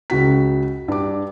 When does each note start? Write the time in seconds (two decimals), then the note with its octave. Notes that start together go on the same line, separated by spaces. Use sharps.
0.10 C#2 C#3 F#4 B6
0.88 G2 D6